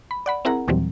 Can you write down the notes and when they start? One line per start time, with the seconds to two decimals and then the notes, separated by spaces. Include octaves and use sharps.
0.11 B5
0.26 D5 F#5 B5
0.45 C4 E4 G#4 A#4 F#5 A#5
0.68 D#2 A#2 E3 F#3 G3 C4